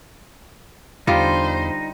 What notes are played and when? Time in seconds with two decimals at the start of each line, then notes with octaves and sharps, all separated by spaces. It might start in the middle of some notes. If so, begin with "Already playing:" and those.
1.07 E2 D3 G3 D#4 F4 C5